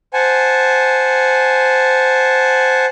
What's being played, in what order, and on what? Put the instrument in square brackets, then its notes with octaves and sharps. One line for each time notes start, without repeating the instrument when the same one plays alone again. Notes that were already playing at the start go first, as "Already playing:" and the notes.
[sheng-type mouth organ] C5 F#5 G#5 A5